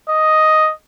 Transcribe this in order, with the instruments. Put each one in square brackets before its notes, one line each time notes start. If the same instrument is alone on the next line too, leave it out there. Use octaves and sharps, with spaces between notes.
[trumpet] D#5